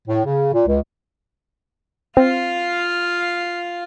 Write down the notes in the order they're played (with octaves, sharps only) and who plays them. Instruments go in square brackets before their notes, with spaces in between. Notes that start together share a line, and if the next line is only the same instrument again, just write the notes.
[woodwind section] A2
C#3
A#2
C#2
[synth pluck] C4 [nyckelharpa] F4 F5